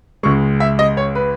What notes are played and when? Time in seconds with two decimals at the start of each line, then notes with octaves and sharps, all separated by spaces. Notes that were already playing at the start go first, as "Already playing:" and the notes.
0.23 C#2 C#3 G#3 C#6
0.60 E5
0.79 D#5
0.97 C#5
1.15 B4